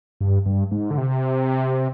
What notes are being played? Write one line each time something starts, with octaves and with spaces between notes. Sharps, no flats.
G2
G2
G#2
D3
C3